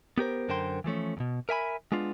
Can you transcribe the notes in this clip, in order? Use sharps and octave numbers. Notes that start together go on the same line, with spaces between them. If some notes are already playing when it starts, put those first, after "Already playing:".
B3 G4 A#4 C5
F#2 D3 A#4 C5 G5 C6
E3 F3 A3 C#4
E2 B2
A#4 E5 G#5 B5
G#3 B3 D4 F4